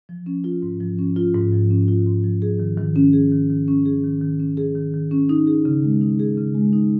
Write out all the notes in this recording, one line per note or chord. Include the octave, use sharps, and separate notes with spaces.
F3
C#4
F4
G#2
F3
C#4
F4
G#2
F3
C#4
F4
G#2
F3
G#4
D#3
D#3
C#4
G#4
D#3
D#3
C#4
G#4
D#3
D#3
C#4
G#4
D#3
D#3
C#4
D#4
G#4
C#3
G#3
D#4
G#4
C#3
G#3
D#4